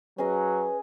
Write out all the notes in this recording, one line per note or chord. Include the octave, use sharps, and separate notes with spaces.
F#3 C#4 G#4 B4 D#5